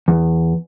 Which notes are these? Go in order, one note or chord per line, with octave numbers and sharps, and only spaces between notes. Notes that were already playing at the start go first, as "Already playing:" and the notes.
E2